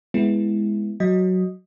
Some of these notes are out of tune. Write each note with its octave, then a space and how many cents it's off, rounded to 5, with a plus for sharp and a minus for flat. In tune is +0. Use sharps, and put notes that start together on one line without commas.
G#3 +0 B3 +0 E4 +0
F#3 +0 D#5 +0